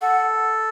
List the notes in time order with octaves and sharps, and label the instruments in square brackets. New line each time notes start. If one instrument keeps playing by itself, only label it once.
[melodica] A4 [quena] F#5